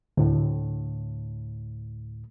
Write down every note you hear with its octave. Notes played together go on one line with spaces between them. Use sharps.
D2 A2